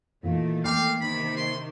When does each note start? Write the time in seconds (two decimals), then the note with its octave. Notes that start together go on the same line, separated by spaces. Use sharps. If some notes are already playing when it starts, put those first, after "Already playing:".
0.23 A#2 D#3 E3 A3 F4
0.64 A#3 B3 F5 G5 D6
1.00 C3 D#3 B5
1.36 C6